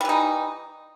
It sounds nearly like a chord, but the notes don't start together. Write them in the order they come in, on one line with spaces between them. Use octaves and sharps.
G3 E3 D#4